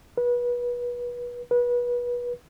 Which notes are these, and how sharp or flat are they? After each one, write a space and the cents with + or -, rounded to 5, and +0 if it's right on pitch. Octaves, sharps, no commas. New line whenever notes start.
B4 -30
B4 -30